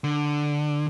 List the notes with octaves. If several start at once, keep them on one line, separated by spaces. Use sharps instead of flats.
D3